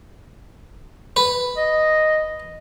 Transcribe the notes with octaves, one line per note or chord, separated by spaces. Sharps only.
B4
D#5